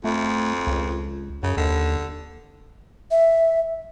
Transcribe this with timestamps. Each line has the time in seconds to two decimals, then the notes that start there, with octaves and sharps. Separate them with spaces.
0.04 F2 A3
0.67 C#2
1.43 F#2 C#3
1.57 D#2 D3
3.11 E5